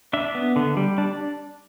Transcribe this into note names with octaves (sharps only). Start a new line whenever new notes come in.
D4 E5
B3
D3
G3
D4